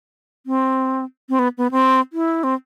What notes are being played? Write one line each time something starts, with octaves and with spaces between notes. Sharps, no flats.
C4
C4
B3
B3
C4
E4
C4